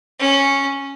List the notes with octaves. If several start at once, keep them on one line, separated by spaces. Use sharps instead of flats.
C#4